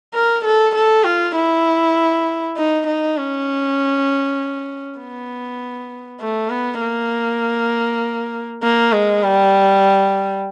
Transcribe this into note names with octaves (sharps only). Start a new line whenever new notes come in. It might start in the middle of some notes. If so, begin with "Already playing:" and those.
A#4
A4
A4
F4
E4
D#4
D#4
C#4
B3
A3
B3
A#3
A#3
G#3
G3